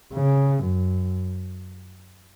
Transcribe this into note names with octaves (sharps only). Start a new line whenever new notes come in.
C#3
F#2